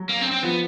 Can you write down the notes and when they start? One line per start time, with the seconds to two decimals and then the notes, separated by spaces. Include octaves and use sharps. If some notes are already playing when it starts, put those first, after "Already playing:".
Already playing: F#3
0.09 A#3
0.21 C4
0.31 C4
0.43 F3 B3